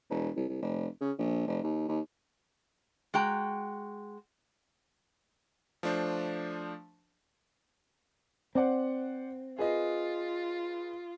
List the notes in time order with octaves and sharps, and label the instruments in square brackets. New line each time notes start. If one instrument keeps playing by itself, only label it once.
[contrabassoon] E1
C2
C2
F1
C#3
A#1
F1
D#2
D#2
[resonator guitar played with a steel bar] G#3 F#4 G5 A#5
[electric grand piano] F3 A3 D4 C5
[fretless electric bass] C4 [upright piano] C5 D5 F#5
[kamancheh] F4 [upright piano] G#4 B4 D#5